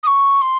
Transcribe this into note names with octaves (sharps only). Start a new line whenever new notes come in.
D#6
C#6
C6